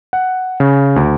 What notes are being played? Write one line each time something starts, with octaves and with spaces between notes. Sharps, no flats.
F#5
C#3
D2